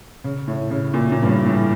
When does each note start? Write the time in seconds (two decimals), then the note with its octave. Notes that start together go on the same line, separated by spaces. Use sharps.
0.24 C#3
0.47 A2
0.70 C#3
0.94 A#2
1.12 A#2
1.23 G2
1.28 A2
1.46 A2